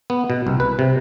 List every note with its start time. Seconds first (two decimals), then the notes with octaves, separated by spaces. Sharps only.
0.10 B3
0.30 B2
0.47 C2
0.60 B4
0.79 C3